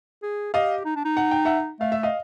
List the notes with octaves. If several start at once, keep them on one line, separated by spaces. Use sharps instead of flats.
G#4
G4 D#5 F5
D#4
D4
D#4
F#5
G5
E5 F#5
A3 F5
E5
D#5 F5